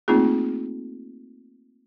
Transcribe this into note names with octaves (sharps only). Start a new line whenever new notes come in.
A3 A#3 C4 D#4 F4 G#4